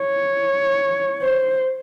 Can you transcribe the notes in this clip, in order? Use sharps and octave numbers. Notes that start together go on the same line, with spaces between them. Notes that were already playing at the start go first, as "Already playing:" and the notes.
Already playing: C#5
C5